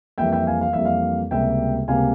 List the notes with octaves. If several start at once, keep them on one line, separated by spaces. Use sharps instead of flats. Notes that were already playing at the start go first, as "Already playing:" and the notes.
F2 E3 G3 A#3 E5 G5
E5 G5
F5 G#5
F5
F2 E3 G3 A#3 E5
F5
C#2 C3 G3 A#3 E5 G5
C#2 C3 G3 A#3 F5 G#5